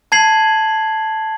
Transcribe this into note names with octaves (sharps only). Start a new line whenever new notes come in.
A5 G#6 C7 F#7